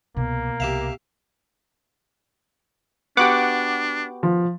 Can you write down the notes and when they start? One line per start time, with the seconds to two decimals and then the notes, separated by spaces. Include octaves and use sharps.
0.17 C2 B2 A#3
0.60 C2 G4 E5 F5
3.17 B3 D4 F#4 G4 F#5 D6
4.23 F3